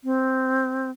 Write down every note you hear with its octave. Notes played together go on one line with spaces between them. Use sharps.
C4